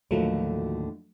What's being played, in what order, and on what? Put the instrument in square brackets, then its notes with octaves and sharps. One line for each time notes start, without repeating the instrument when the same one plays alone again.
[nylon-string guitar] D#2 A2 D3 [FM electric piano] F3 F#3 A3